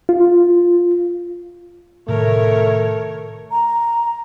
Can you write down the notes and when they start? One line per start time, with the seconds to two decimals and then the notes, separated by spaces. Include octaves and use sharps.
0.09 F4
2.08 A2 C3 D#3 A3 A#4 C#5
3.51 A#5